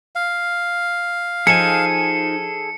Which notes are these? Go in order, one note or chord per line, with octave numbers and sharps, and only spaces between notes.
F5
F3 D#4 G#4 A4 G#5 C#7